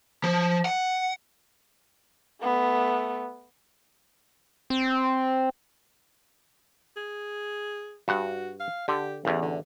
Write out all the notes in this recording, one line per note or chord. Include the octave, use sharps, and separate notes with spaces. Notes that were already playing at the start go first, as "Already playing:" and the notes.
F3
F#5
A3 B3
C4
G#4
G2 F#4 F#5
F5
D3 G4
A1 E2 E3
D3